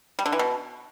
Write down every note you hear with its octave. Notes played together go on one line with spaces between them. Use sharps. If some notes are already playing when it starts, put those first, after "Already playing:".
G3
D3
E3
B2